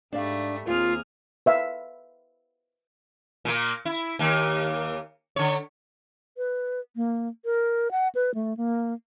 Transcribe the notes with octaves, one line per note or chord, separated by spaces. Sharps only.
G#2 G3 A3 D4 D5 F5
D#2 A#3 C4 F4 G#4 F6
B4 E5 F5
A#2 A#3
E4
D#2 A#3
D3 C#5
B4
A#3
A#4
F#5
B4
A3
A#3